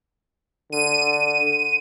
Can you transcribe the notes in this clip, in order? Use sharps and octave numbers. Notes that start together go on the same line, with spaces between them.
D3 D#7